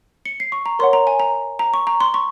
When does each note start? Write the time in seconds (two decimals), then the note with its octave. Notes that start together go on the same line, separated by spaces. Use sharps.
0.25 C#7
0.40 C7
0.52 C#6
0.66 A#5
0.79 A#4 C#5 F#5 C6
0.93 A#5
1.07 G#5
1.20 A#5
1.59 A#5
1.74 C#6
1.87 A#5
2.00 C6
2.14 C#6